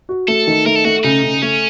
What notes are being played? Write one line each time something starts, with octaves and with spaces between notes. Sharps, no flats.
F#4
A3 A4
D#3
A3 A#4
A4
A3 F#4
C#3 D#4
C#3
A3 C#4